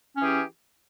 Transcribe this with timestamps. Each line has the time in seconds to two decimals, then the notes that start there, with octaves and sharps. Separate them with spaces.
0.17 C#4
0.20 E3
0.22 G#4
0.25 G4